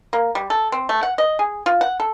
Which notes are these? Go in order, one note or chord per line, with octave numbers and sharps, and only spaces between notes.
A#3
G3
A4
C4
A3
F#5
D#5
G#4
F4
F#5
A4